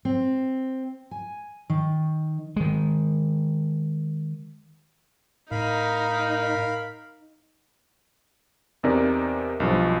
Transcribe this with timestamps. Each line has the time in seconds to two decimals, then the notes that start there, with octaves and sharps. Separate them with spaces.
0.05 C4
1.11 G#5
1.70 D#3
2.56 D#3 G#3
5.51 A2 D#4 A#4 F5 B5
8.83 E2 C3 D#4 A#4 D5
9.60 B1 G2 F3